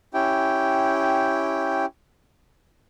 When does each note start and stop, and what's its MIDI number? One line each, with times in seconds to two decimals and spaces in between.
0.14 1.86 61
0.14 1.86 64
0.14 1.86 67
0.14 1.86 79